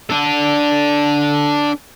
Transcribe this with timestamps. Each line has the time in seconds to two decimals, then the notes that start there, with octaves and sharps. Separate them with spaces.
0.10 D4 A4